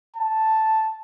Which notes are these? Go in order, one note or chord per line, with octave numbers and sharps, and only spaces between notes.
A5